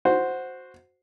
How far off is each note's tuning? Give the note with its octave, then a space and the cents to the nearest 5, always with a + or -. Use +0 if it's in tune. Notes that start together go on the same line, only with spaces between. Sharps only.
F#4 -10 C5 +0